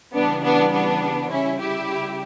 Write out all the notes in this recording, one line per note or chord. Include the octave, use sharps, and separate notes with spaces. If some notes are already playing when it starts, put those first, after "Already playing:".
C#3 E3 G3 B3 D4
B3 D4
B3 D4
C#3 G3 C#4 E4
E4 G4